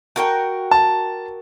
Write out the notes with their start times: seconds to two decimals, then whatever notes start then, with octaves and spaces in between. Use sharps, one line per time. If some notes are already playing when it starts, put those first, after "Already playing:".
0.16 F#4 A#4 G5
0.71 A5